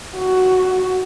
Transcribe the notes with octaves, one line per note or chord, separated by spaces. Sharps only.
F#4